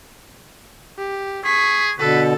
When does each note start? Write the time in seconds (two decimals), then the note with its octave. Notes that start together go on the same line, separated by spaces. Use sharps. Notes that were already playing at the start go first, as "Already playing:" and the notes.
0.98 G4
1.45 G#4 C#6 B6
1.99 B2 D3 A4 B4